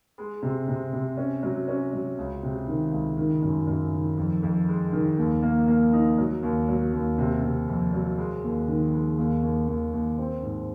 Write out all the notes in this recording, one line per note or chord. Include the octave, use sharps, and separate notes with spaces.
G#3
C3
C3
C3
C#4
F#3
C#4
F#3
C#2
C3
D#3
C#2
D#3
F#2
F#2
D#3
F2
F2
G#3
D#3
D#2
A#3
A#3
D#4
F#3
D#2
F#3
D#2
C3
C3
F2
F#3
G#3
D#2
D#3
G#3
D#2
D#2
D#2
D#2
C4
G#2